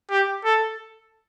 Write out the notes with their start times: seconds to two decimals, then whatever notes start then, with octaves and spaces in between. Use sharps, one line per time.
0.10 G4
0.44 A4